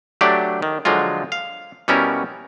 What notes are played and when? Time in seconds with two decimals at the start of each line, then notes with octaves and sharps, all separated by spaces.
0.21 F#3 A3 D4 G4 D5
0.62 D#3
0.85 D3 F3 F#3 G#3 F4
1.32 F5
1.88 B2 G3 B3 C#4 E4 A#4